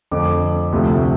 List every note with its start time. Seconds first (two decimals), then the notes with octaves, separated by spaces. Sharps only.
0.11 F2 D3 A3 D6
0.72 D2 C3 F3 A3